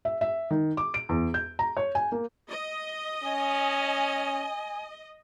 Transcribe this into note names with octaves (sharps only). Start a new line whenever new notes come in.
E5
E5
D#3
D6
D7
E2
G6
A#5
C#5
G#5
A#3
D#5
C#4 G#5